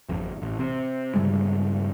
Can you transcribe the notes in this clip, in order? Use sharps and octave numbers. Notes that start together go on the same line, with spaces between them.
G#1 F2
A1
C3
G2 C#3 G3 G#3